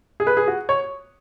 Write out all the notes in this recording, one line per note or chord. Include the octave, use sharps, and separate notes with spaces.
G#4
B4
G#4
F#4
C#5